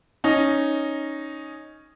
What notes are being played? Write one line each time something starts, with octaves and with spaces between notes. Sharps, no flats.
C#4 D#4